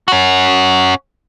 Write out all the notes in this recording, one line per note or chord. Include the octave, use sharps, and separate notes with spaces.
C#4 F#4